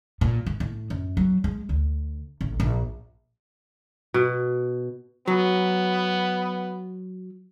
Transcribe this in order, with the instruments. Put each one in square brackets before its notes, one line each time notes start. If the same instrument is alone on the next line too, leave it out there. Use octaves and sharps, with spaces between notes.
[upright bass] A#2
G#2
A2
F#2
F#3
G#3
D2
A1
A#1
[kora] B2
[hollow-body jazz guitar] F#3 [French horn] B3